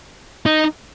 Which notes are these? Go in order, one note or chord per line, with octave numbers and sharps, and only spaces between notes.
D#4